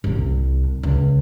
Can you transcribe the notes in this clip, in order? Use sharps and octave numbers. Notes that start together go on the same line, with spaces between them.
C2 C3
C#2